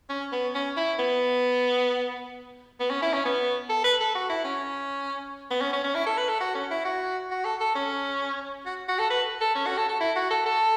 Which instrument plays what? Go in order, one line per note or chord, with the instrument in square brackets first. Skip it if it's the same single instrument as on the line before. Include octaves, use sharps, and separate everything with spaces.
[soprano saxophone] C#4
B3
C#4
E4
B3
B3
C#4
E4
C#4
B3
A4
B4
A4
F#4
E4
C#4
B3
C#4
C#4
C#4
E4
A4
B4
A4
F#4
C#4
E4
F#4
F#4
A4
A4
C#4
F#4
F#4
A4
B4
A4
C#4
F#4
A4
A4
E4
F#4
A4
A4